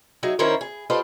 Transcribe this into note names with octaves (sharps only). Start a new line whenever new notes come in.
F#3 D#4 G#4 E5
D#3 C#4 E4 A#4 C5 C#5
G#4
F4 G4 A4 B4 C5 D#5